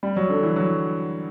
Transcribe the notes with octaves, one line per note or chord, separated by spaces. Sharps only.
G3
F#3
D3
E3
F#3